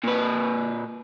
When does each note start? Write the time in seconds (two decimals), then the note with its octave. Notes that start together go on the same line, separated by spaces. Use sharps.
0.04 A#2 B4